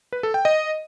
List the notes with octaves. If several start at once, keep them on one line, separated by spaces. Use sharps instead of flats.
B4
A4
G5
D#5